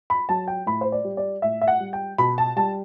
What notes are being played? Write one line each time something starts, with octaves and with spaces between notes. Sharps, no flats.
B5
F#3 A5
G5
A2 B5
C5
D5
G3
D5
A2 E5
E5
F#5
G3
G5
B2 B5
A5
G3 A5